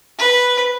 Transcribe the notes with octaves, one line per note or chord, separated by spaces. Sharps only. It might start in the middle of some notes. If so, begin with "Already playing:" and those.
B4